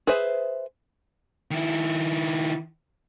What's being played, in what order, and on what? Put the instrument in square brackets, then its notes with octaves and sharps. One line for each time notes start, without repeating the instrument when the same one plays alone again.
[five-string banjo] G#4 B4 C5 E5
[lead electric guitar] D#3 E4